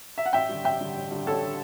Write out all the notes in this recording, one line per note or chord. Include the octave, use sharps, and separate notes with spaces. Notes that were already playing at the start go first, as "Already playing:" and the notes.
E5
F#5
A1 E5 G5
G2 D3
A1 E5 G5
G2 D3
A1
G2 D3
A1 A4 C#5
D3